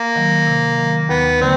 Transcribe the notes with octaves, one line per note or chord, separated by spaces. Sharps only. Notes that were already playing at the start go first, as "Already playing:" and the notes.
Already playing: A#3
D#3 F#3
C3
D#3 F#3
D#2 B3
D3 F#3 A#3 C4